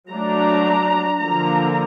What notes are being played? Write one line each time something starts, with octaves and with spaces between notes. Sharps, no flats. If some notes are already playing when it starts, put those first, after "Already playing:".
F#3 A3 D4 A#5
D3 F3 A#3 A#5